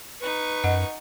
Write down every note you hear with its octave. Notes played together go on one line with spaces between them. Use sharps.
D#4 B4 C#6
F#2 D#5 F#5